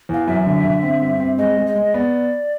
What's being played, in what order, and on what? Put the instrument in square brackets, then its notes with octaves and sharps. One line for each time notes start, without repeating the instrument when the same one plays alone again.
[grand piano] E2 [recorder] F5
[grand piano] F#2 [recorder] E5
[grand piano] D3
D3
C4
G2
C4
[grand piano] G#3 [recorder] D#5
[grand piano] G#3
[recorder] D#5
[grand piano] G#3
[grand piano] B3 [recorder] D5